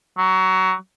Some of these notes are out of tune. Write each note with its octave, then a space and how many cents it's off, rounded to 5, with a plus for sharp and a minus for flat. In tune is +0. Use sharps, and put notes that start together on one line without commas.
F#3 +20